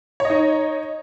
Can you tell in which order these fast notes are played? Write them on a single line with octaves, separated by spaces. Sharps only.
C#5 D#5 D#4